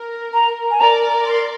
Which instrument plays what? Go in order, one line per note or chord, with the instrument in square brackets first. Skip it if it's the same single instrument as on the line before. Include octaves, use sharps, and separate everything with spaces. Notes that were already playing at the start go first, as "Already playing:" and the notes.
Already playing: [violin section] A#4
[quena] A#5
G#5
[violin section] A#4 D5 [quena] A#5
[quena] C6